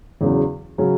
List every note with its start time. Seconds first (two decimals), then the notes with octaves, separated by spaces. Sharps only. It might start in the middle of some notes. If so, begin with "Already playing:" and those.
0.21 E2 C#3 F#3 C#4
0.78 C#3 F#3 C#4